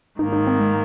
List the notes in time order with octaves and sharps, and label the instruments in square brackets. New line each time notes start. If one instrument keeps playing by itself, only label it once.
[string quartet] G#2 D#3 A#3 [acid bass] D#4
[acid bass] D#4
C4
G#3